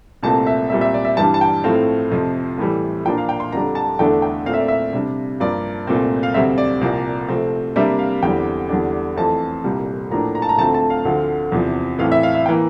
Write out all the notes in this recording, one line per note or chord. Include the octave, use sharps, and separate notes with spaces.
C2 A#2 A3 C4 A5
E5
A#2 G3 C4 E5
E5
D5
E5
G2 E3 G3 D4 A5
A5
G5
A2 F3 A3 C4 F5
F2 C3 F3
A2 E3 G3
A#2 F3 A#3 D4 G5
F5
G5
C6
F2 D3 G3 D4 A#5
A5
E2 D3 A3 D4 G5
G5
A#2 A3 C4 F5
E5
D5
E5
C3 G3 D4
G2 F3 A#3 D5
C2 A#2 A3 C4
F5
D2 C3 G3 C4 E5
D5
C2 A#2 F3 A#3
C3 F3 A3 C4
C3 G3 A#3 D4 E5
F5
E2 D3 G3 C4 G5
E2 D3 G3 D4
F2 E3 A3 C4 A5
C2 A#2 G3
A2 F3 A#3 D4 A#5
A#5
A5
A#5
D2 D3 F3 A3 C4 A5
A5
F5
D2 D3 F3 C4
E2 C3 F3
A2 E3 A3 C4 F5
E5
F5
E5
G5
E3 A#3